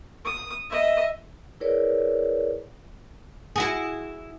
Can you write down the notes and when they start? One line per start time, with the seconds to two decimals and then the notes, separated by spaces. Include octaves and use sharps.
0.25 D#6
0.70 D#5 E5
1.60 E4 G#4 A#4 B4 C#5 D5
3.56 E4 F#4 G#4